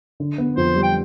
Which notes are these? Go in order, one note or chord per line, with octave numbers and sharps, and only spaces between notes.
D3
B3
F2 C5
G3
G5